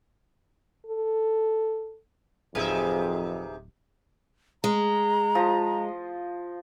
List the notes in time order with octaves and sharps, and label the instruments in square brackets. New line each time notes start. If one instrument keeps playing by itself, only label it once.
[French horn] A4
[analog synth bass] D1 [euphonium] F2 [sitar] C3 D#4 E5 [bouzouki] G#4 B4 F5
[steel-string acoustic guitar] G#3 [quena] A#5
[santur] F3 D#5